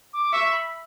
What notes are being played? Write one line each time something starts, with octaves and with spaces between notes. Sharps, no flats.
D6
E5 C#6
B5